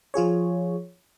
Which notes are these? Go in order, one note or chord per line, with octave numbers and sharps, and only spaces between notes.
F3 F4 G#4 C#5